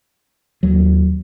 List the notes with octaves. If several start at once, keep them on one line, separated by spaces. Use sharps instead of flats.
D#2 F#3